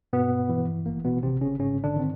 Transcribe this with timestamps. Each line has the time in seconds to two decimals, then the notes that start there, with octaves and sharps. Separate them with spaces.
0.13 G2 B2 B3
0.49 E3
0.86 G#1 A#3
1.05 B2 B3
1.23 G#1 C3 C4
1.41 C#3 C#4
1.59 G#2 C#3 C#4
1.84 D3 D4
1.96 D#3 C4